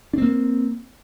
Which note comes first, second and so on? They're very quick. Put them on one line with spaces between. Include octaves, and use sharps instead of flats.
D4 C4 A#3